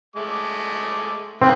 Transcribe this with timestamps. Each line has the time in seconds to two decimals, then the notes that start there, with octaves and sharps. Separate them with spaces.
0.16 G#3 A3 D6
1.42 D#3 A#3 C4 B4